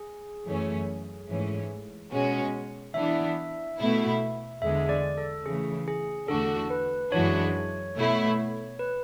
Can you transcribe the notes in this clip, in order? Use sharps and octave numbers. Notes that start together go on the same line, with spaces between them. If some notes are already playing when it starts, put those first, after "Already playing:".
Already playing: G#4
F#2 E3 A3 C#4
G#2 E3 A3 C#4
B2 G#3 C#4 F#4
E3 B3 D4 E5
B2 A3 E4
E2 D3 G#3 E5
D5
A4
C#3 E3 A3 G#4
G#4
E2 D3 A3 D4 F#4 A4
B4
F#2 E3 G#3 D4 F#4 C#5
B2 A3 E4
B4